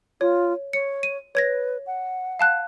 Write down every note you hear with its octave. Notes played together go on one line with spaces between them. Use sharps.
F4 C#5
C#5 C#7
D#7
B4 C#5 G#6 A#6
F#5
F5 A5 F#6